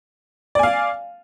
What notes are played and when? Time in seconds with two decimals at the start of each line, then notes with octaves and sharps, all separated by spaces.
0.55 D5
0.59 G#5
0.63 F5